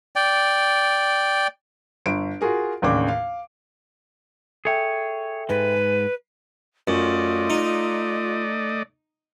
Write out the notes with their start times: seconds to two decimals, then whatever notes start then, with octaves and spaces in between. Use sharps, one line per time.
0.16 D5 G5
2.06 G1 D7
2.41 F4 F#4 G#4 A#4
2.82 A1 D#2 C#3 D4 D6
3.08 F5
4.65 G#4 A4 C#5 E5 G5
5.49 G#2 G#3 B4
6.88 F#2 A3 F4 D5 D#5
7.50 D#4